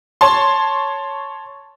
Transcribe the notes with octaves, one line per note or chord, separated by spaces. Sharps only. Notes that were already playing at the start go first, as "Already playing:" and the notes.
C#5 A5 C6